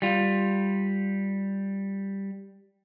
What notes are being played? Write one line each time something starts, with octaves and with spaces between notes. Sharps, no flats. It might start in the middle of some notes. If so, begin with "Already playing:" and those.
G3 F4